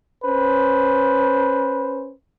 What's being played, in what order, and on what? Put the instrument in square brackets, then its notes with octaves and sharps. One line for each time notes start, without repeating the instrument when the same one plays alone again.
[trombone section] C#4 B4 C5